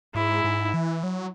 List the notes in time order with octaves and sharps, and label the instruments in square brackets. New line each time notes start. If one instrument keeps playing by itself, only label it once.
[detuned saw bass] G#2 [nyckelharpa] E4
[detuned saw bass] G#2
E3
F#3